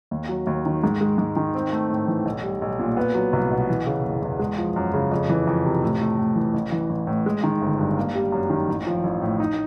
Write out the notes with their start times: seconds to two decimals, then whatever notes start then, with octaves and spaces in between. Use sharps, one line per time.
0.11 D#2
0.29 F#3
0.47 D#2
0.66 D#3
0.84 G#2
1.01 G#3
1.18 G#2
1.36 D#3
1.55 C4
1.72 A3
1.90 A2
2.08 E3
2.25 B1
2.43 G3
2.62 B1
2.79 A#2
2.97 B3
3.15 F#3
3.33 C2
3.51 B2
3.69 E3
3.87 C#3
4.05 F#1
4.22 E2
4.39 G#3
4.58 F3
4.76 F#2
4.94 C#3
5.11 F2
5.29 E3
5.47 F2
5.65 C3
5.82 A2
6.01 A3
6.19 A2
6.36 E3
6.54 A1
6.72 E3
6.90 A1
7.07 A2
7.26 G#3
7.44 D#3
7.62 G1
7.78 G2
7.97 A#3
8.15 G3
8.32 F#2
8.50 D#3
8.68 A1
8.87 F3
9.04 A1
9.22 A2
9.40 D#4